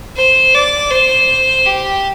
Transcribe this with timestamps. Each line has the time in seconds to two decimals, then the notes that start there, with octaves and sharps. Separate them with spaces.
0.17 C5
0.54 D5
0.91 C5
1.66 G4